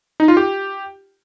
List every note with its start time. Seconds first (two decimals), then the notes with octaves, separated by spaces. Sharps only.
0.20 D#4
0.28 F4
0.37 G4